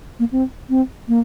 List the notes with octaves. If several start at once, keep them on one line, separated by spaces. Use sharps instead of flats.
A#3
C4
C4
A#3